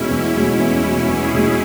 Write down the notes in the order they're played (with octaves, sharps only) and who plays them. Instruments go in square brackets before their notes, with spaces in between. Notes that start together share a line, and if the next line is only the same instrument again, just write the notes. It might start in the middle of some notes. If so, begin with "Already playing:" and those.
Already playing: [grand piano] E2 B2 G#3 [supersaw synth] C#4 E4
[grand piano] E2
B2 G#3
[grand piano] E2 [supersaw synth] C#4 E4
[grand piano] B2 G#3
[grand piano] E2 [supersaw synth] E4 G#4
[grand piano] B2 G#3